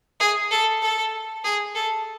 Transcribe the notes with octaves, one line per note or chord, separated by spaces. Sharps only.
G#4
A4
A4
G#4
A4